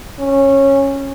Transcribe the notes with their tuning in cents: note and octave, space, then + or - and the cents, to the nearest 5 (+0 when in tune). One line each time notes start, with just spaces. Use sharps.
C#4 -15